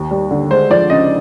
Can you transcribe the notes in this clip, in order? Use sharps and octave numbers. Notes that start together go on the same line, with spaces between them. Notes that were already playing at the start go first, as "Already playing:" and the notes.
Already playing: D#2
G3
D3
G#3 C5
F3 D5
C#3 D#5